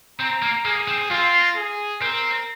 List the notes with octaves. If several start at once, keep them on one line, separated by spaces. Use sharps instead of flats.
C4 A#5
A#3
A#3 G#4
C4
C4 F4
G#4
C4 A#4